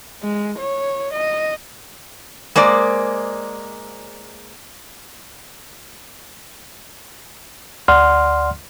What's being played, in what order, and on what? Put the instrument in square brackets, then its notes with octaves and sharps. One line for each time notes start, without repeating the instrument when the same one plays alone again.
[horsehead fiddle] G#3
C#5
D#5
[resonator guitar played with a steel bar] G#3 A#3 C5 D5
[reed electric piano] D2 D5 F#5 C6 F6